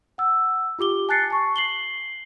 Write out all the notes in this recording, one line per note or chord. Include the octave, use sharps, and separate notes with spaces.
F#5 E6
F4 G4 D6 G7
G#5 A5 F#6 A6 C7 C#7
A5 C#6
C7 F#7 G7